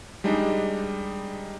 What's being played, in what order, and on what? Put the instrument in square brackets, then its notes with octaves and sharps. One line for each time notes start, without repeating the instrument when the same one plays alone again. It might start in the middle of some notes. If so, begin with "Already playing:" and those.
[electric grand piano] G3 G#3 D4 D#4